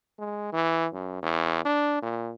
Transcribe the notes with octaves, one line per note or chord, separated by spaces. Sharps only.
G#3
E3
F#2
E2
D4
A#2